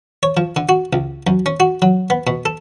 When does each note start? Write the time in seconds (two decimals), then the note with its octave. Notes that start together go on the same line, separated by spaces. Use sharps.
0.23 C#5
0.37 F3
0.56 D3
0.69 F#4
0.93 C#2
1.27 F#2
1.46 C#4
1.60 F#4
1.82 F#3
2.10 B3
2.27 B2
2.45 A4